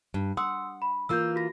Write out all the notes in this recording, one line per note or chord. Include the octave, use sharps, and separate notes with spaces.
G2
F#5 C6 D#6 E6
B5
E3 A#3 F4 E6 G6
F#4 A#6